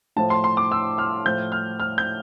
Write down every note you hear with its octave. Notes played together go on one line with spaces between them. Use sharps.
A2 F3 A5
C6
C6
D6
E6
F6
A2 F3 G6
F6
F6
G6